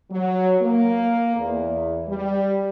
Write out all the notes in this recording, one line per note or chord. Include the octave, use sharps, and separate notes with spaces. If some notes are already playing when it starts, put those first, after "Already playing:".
F#3
A#3
E2
G3